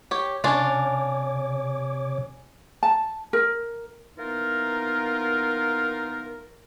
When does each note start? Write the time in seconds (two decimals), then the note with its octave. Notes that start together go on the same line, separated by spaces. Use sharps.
0.11 G4 C#5
0.44 C3 C#4 D4 F4 C#5 D6
2.83 A5
3.33 A#4
4.18 E3 A#3 B3 D#4 F4 A#4